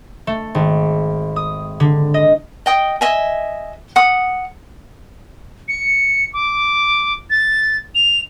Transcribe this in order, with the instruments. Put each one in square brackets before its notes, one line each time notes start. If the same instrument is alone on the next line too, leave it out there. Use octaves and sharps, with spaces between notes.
[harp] A3
G#1
D#6
D3
D#5
[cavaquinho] D#5 G5 D#6
D#5 E5 G#5
F#5 D#6
[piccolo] C#7
D6
A6
F7